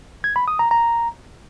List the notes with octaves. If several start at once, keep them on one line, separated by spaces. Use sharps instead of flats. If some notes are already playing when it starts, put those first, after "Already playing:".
G#6
B5
D#6
A#5
A#5